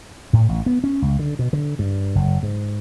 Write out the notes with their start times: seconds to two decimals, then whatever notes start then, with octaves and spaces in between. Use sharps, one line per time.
0.33 A2
0.49 A1
0.66 B3
0.84 C#4
1.02 C#2
1.19 D3
1.39 B2
1.53 D3
1.79 G2
2.15 F#1
2.43 G#2